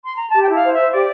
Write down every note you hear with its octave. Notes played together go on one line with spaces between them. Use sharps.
C6
A#5
G4 A5
G5
E4 F5
C5
E5
C5
G4 D5